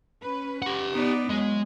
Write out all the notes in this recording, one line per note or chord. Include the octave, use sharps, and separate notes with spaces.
C#4 B4
G4 F#5
B3 D#4 D5
E2 F#3 G#3